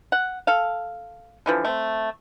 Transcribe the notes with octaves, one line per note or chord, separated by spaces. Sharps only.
F#5
A4 F5
D3 E3 F3
A3 C4